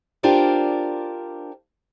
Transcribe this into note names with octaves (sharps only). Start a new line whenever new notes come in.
D4 F4 G4 A#4 C5 D5